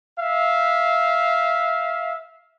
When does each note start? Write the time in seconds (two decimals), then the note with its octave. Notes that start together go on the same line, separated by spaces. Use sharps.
0.18 E5 F5